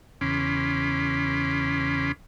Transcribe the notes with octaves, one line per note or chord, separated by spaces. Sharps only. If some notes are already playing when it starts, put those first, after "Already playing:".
E2 C#3 C#4 B5 C6 D6